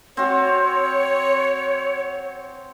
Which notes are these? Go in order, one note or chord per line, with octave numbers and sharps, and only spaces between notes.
C4 F#4 C#5